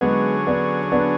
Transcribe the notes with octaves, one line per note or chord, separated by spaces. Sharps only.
D3 F#3 G#3 B3 C#4 G#4
B3 D4
B3 D4